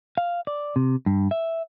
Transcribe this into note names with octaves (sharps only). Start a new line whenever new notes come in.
F5
D5
C3
G2
E5